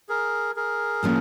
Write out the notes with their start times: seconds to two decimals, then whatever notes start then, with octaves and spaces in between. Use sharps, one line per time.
0.09 G#4 A#4
0.56 G#4 A#4
1.03 A2 F3 A#3 C#4